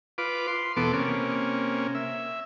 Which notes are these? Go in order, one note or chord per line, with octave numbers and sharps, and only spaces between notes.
F4 B4 D6
C6
E2 B2 B3 A4 D6
C3 A#3 C#4
E5